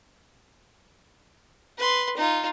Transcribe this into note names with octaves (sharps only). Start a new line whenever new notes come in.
B4 C6
D#4 F4